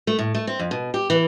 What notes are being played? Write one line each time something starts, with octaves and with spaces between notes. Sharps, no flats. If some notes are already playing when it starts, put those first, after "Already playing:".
A3
A2
A3
C4
F2
B2
G4
E3